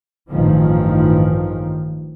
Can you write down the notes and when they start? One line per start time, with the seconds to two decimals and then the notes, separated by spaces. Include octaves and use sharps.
0.30 A1 G2 D#3 F3